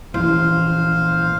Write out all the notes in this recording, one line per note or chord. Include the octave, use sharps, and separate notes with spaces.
A#1 E3 E4 C5 F5